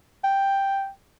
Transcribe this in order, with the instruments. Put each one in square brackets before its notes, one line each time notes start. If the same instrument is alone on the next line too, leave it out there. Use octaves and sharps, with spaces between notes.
[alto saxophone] G5